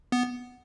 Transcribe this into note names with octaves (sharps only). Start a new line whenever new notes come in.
B3